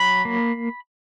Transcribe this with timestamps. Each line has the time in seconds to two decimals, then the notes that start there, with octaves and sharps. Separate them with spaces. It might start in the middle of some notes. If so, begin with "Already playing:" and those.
Already playing: F#3 B5
0.25 A#3